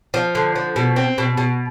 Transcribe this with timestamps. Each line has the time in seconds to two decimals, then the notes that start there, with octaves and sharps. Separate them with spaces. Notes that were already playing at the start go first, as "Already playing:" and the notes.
0.14 F3
0.35 D3
0.55 F3
0.76 B2
0.96 C4
1.18 B2
1.37 B2